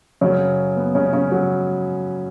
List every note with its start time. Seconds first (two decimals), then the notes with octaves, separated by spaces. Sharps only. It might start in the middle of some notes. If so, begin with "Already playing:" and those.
0.21 F#2 C#3 F#3 C#4
0.77 B3
0.95 C#3 C#4
1.13 C#3 C#4
1.32 F#3 F#4